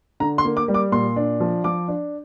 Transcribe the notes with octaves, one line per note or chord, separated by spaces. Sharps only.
D3 A#5
C6
A#3
D6
G3
D6
A#2 C6
D4
F3
F3 D6
D4